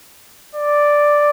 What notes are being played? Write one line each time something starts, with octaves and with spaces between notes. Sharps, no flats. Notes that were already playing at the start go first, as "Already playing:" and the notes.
D5